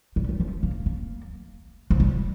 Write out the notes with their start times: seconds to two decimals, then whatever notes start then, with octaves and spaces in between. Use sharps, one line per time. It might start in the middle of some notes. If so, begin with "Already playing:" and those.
0.16 G3
0.29 G3
0.40 F3
0.63 A#3
0.86 A#3
1.90 F3
2.00 G3